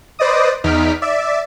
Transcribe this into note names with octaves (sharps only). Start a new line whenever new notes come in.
B4 C5 D5 D#5 D#6
E2 D#4 F6 B6 D7
D5 E5